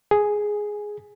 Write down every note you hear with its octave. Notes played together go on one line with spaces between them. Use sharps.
G#4